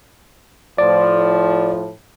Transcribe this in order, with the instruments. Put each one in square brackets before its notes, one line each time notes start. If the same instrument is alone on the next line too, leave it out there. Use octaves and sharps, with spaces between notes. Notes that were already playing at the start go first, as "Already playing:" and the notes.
[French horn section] A2 F3 [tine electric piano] D5